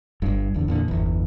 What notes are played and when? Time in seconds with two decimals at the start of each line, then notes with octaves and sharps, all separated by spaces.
0.22 G1 G2
0.54 D#1 E2 D3
0.68 E2 A#2 D3
0.88 G1 E2